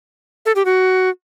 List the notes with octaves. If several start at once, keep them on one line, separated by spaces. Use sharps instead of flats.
A4
G4
F#4